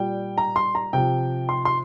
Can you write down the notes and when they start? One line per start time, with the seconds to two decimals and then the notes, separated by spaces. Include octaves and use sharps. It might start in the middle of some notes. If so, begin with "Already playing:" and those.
Already playing: A#2 G3 G5
0.38 A#5
0.56 C6
0.75 A#5
0.93 C3 F3 G5
1.49 C6
1.65 C6